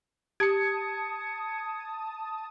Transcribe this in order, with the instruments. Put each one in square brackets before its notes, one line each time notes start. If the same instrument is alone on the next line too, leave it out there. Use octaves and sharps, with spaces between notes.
[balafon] G4 [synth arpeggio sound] A5 D#6 [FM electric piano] G#6 C#7